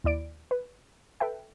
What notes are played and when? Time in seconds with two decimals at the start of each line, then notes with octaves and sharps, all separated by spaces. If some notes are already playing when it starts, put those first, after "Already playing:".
0.04 D#2 E4 D5 D7
0.51 B4
1.20 A4 B4 E5 G5